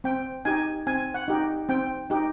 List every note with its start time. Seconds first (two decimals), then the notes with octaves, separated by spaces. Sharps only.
0.04 C4 G5
0.45 D#4 G4 G#5
0.87 C4 G#5
1.14 F#5
1.28 D#4 G4
1.69 C4 G5
2.10 D#4 G4